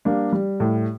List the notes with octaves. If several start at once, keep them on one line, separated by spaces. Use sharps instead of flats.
G3 A#3 D4
G3
A2